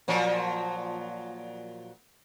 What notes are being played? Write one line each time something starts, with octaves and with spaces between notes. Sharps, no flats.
A#2 F3 F#3